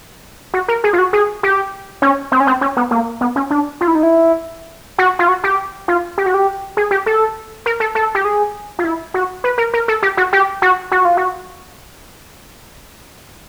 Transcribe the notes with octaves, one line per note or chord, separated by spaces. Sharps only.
F#4
A#4
G#4
F4
F#4
G#4
G4
C#4
C4
C#4
C4
C#4
B3
A#3
B3
C#4
D4
F4
E4
D#4
E4
F#4
F4
F#4
G4
F4
G4
F#4
G4
G#4
G4
A4
A#4
A4
A4
G4
G#4
F4
E4
F#4
B4
A#4
A#4
A4
G4
F#4
G4
F#4
F#4
F4
F#4